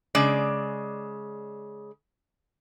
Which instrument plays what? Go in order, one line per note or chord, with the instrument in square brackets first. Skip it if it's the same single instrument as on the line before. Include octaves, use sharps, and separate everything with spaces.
[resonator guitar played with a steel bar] C#3 G#3 D5